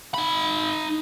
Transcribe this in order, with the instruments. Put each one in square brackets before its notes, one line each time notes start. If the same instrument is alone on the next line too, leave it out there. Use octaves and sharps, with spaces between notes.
[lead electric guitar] D#4 B5